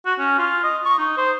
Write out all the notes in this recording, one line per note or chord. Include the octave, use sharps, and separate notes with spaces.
F#4
C#4
F4
D#5
C#6
D#4
C5